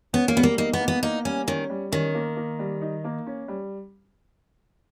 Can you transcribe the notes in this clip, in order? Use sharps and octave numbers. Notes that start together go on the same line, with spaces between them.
B3 C#4
A#3
G3 B3
A#3
A#3 D#4
B3
A#3
B3
A#3 D#4
G3 C#4
D#3 C#4
G3
D#3 C#4
A#3
A#3
G3
D#4
A#3
C#4
G3